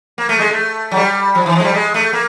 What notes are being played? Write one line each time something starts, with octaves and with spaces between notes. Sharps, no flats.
A#3
A3
G#3
A3
F#3
G3
F3
E3
F3 G#3
G3
G#3
A3
A#3